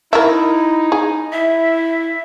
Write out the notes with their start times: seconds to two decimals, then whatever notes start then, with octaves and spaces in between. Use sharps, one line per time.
0.13 D#4 E4 A#4 E5
0.92 G#4
1.32 E4 E5